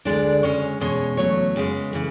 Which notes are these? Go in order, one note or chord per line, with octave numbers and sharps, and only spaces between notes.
D2 C#3 G#3 D4 D5
C#3 G#3 C#4 C#5
E2 B2 G#3 C#4 C#5
E2 C#3 F#3 A3 C#5
F#2 C#3 G#3 B4
C#3 E3